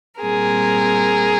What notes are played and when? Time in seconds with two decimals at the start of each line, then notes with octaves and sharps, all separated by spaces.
0.21 A#2 G3 C4 G#4 A#4